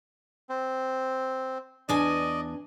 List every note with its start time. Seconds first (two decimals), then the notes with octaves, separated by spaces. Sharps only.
0.49 C4
1.89 E2 D4 D5 D#5 G#5